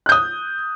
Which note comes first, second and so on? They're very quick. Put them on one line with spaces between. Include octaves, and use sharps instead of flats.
F#6 G6 D#6